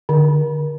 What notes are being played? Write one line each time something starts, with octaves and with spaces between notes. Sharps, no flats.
D3